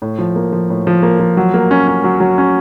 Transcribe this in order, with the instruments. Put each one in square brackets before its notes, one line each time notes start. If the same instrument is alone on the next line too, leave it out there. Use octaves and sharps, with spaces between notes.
[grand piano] A2
F3
A#3
F3
A2
F3
A#3
F3
F#3
A#3
C#4
C#4
F#3
F#3
C#4